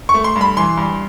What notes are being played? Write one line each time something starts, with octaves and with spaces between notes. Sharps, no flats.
C#6
A3
C6
G2
B5
E3 C6
G2